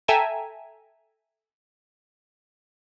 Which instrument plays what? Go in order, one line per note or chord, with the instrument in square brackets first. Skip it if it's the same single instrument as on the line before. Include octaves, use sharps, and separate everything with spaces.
[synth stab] A4 E5 G5 G#5 A#5